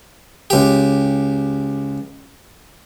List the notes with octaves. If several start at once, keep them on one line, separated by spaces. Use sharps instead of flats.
C#2 G4